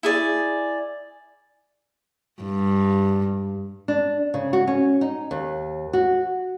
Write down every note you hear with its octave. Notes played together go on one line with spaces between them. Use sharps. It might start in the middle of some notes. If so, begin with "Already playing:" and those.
E4 G#4 D5
G2
D4
C#3
F#4
C#4
D#4
D#2
F#4